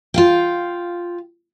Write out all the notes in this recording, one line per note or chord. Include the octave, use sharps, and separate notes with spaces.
F4 F5 G5